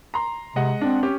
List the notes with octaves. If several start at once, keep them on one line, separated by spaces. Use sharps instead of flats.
A#5 C6
C3 G#3 D#5 F#5
C4 D4
C#4 G4